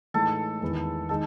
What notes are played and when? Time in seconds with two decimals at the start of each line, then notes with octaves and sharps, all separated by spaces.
0.14 A2 E3 G#3 D#4 A4
0.62 E2 D#3 G#3 B3 E4
1.09 D#3 G#3 D#4 A4